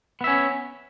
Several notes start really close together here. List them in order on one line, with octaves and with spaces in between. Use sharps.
B3 E5 C#4